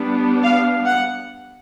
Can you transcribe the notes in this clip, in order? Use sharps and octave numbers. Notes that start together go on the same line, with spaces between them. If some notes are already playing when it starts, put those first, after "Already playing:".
Already playing: G3 B3 D4
F5
F#5